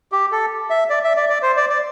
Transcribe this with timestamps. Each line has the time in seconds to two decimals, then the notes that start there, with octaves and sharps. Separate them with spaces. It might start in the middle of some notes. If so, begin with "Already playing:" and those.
0.12 G4
0.32 A4
0.70 E5
0.90 D5
1.04 E5
1.16 D5
1.29 D5
1.42 C5
1.57 D5
1.69 D5